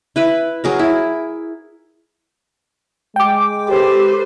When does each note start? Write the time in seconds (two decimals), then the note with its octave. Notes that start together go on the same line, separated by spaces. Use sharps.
0.16 E4 B4 E5
0.64 F#3 G#4 A#4
0.79 E4
3.16 G#3 G5 D6
3.68 G4 A4 B4 C5